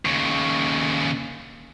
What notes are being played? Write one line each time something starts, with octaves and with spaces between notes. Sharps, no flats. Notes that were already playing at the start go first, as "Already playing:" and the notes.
D#2 C#3